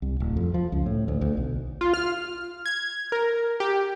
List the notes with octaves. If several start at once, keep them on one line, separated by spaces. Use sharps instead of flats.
C2
D1
F2
F3
C#2
A2
D2
D2
B1
F4
F6
G#6
A#4
G4